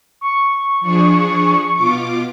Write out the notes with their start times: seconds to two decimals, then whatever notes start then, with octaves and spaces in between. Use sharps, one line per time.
0.21 C#6
0.81 F3 D4 G#4
1.74 B2 F4 D6